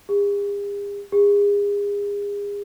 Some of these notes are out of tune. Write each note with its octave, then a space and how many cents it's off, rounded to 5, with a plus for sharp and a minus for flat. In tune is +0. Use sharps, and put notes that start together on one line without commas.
G#4 -45
G#4 -35